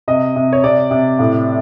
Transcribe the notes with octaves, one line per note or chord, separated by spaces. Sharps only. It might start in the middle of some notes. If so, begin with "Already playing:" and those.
C3 D#5
C3
C#5
C3 D5
C3
A2